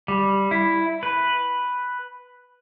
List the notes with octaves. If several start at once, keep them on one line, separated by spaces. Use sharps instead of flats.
G3
E4
B4